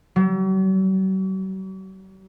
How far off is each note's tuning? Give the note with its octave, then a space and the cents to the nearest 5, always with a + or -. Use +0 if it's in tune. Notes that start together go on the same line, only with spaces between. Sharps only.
F#3 +45